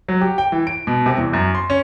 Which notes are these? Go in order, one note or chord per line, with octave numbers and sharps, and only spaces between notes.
F#3
G4
G5
E3
D7
B2
C3
E2
F#2
C6
C#4